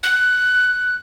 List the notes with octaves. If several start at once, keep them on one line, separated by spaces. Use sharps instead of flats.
F#6